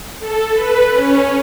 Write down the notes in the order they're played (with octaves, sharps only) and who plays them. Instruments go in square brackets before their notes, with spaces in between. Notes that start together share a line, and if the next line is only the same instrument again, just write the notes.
[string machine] A4
B4
C#4